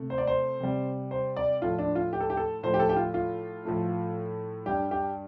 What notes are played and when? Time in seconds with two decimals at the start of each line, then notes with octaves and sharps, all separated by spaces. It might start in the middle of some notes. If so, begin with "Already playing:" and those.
Already playing: C3 A3
0.10 C5
0.18 D5
0.27 C5
0.60 C3 G3
1.11 C5
1.37 D5
1.62 A2 F3 A3 F4
1.79 D4
1.95 F4
2.13 G4
2.20 A4
2.30 G4
2.37 A4
2.63 A2 F3 A3 C5
2.74 G4
2.80 A4
2.89 G4
2.96 F4
3.14 F4
3.65 A2 F3 A3
4.66 G2 G3 G4
4.91 G4